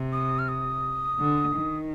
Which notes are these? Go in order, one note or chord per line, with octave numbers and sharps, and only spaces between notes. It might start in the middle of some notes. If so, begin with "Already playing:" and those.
Already playing: C3
D#6
F6
D#6
D3
D#3